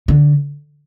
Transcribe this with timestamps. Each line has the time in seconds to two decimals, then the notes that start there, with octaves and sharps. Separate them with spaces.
0.08 D3